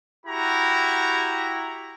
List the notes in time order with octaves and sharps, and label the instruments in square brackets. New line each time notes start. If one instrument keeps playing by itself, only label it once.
[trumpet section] E4 F#4 G4 A#5